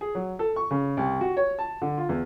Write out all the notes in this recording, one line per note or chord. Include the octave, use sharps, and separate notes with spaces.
G#4
F#3
A4
C#6
C#3
C2
F#4
C#5
A5
D3
F4
E2